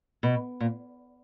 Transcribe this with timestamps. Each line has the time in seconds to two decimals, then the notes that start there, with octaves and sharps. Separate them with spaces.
0.23 B2
0.60 A#2